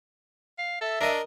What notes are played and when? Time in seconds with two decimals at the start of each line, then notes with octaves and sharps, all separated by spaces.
0.59 F5
0.81 A4 E5
1.01 D4 A#4 D#5